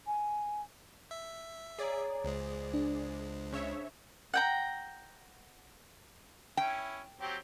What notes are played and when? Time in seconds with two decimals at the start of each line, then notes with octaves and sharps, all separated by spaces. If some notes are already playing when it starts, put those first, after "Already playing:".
0.07 G#5
1.11 E5
1.78 G#4 C#5 D5 A#5
2.24 C#2 G#3 C5
2.74 D4
3.52 C#3 C#5 E5
4.34 F#5 G5 A#5
6.57 C#4 E4 G5
7.21 F#3 C4 G4